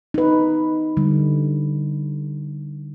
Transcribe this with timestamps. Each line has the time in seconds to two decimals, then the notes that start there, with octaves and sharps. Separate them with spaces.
0.14 D#4 B4
0.97 D3 G3